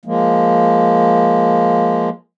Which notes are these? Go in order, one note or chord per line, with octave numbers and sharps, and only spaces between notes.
F3 G#3 A#3